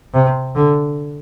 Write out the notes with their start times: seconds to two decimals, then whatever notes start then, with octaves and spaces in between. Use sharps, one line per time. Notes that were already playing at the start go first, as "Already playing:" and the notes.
0.14 C3
0.55 D3